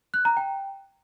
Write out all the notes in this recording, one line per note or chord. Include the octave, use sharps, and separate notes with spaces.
F#6
A#5
G5